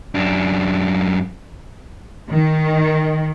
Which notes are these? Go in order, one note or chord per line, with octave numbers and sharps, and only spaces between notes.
F#2 D4
D#3